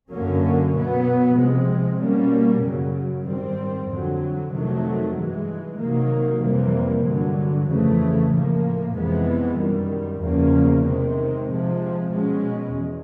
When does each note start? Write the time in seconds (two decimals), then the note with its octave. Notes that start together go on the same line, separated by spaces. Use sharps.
0.10 F#2 D3 F#3 A#3 C#4
0.74 B2 F#3 B3
1.36 C3 F3 G#3 C4
2.01 B2 G3 A#3 C#4
2.63 F#2 C#3 F#3
3.27 G#2 D#3 G3 C4
3.89 F2 D3 F#3
4.53 F2 C3 D#3 F#3 A3
5.16 G2 E3 G#3
5.78 C3 D#3 F#3 A#3
6.41 F2 C3 E3 G3 A#3
7.05 G2 D3 F#3
7.68 F2 C#3 E3 A3
8.31 A2 F3 A#3
8.94 F2 C3 E3 G#3 B3
9.57 F#2 D#3 G3
10.21 E2 C#3 F3 A#3 C#4
10.84 C3 D#3 G#3 C4
11.47 C3 F3 G#3
12.11 B2 G#3 C#4
12.73 E2